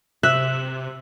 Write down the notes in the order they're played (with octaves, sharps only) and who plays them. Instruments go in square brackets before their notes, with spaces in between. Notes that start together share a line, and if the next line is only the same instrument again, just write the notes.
[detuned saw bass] C3 [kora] E5 [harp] F#6